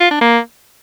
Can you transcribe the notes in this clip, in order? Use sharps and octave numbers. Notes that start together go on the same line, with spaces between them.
F4
D4
A#3